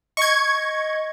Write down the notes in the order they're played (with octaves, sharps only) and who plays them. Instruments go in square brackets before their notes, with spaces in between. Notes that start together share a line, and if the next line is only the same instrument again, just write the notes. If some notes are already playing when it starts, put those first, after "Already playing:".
[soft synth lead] D#5 [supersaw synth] C#6 G#6